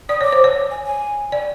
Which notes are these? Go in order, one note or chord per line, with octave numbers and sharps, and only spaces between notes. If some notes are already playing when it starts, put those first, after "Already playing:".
D5 D#6
C#5 D6
C5
C#5
G#5
G#5
D5